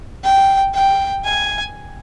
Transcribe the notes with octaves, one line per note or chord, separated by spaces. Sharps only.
G5
G5
G#5